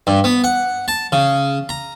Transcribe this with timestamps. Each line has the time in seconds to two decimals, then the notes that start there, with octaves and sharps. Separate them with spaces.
0.07 G2
0.24 B3
0.44 F#5
0.88 A5
1.12 C#3
1.69 A#5